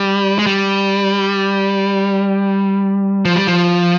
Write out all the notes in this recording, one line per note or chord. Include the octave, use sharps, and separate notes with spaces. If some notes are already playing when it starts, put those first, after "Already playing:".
Already playing: G3
G#3
G3
F3
G3
F3